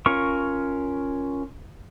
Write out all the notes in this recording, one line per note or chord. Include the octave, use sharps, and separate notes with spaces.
C#4 F4 A#4 C#6